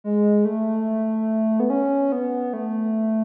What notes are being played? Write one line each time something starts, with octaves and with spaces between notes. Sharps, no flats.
G#3
A3
B3
C#4
B3
A3